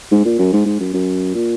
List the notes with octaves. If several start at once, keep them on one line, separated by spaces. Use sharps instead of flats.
G#2
A#2
F#2
G#2
G#2
F#2
F#2
A#2